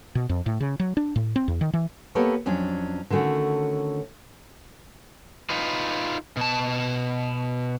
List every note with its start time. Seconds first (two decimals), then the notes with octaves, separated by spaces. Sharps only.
0.15 B2
0.29 F2
0.46 A2
0.60 C#3
0.79 F#3
0.97 D4
1.16 A2
1.36 C4
1.48 E2
1.61 D#3
1.73 E3
2.15 A#3 B3 G4 A4 B4 C#5
2.46 F2 F#3 C#4 D4
3.10 D3 D#3 A3 C#4 F#4
5.50 D#4 F4 B4
6.37 B2 A5